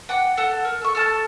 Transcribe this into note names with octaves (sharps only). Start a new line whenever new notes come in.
F#5 G5 D6
A4 F#5 A5
A#4
A4 C#6
A4 A5 F6